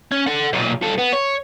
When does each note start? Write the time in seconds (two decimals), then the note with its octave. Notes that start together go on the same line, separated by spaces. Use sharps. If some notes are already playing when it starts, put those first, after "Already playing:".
0.12 C#4
0.27 A4 F#5
0.53 B1 A#2
0.82 G2 A4
0.98 B3
1.13 C#5